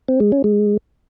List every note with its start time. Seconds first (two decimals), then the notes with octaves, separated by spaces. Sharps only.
0.08 C4
0.20 G#3
0.32 C#4
0.44 G#3